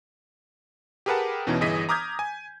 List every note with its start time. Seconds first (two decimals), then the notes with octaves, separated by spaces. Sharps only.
1.06 G4 G#4 A#4 B4 F#5 A5
1.47 E2 B2 E3 C#4 D#4
1.61 G1 E3 G#4 D#5 B6 D#7
1.89 A#5 D6 D#6 F6 G6 G#6
2.19 G#5